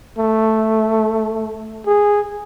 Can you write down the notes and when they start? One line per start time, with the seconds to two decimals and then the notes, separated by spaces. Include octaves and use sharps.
0.19 A3
1.87 G#4